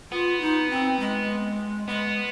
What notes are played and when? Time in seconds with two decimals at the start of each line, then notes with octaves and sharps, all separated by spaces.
0.11 B3 F4
0.41 D#4
0.70 C4
1.00 G#3
1.88 G#3 B3